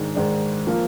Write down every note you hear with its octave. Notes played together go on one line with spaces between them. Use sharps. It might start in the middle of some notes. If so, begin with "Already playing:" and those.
Already playing: G#2 D#3 G#3 D4
G#2 D#3 G#3 D4
F3 A#3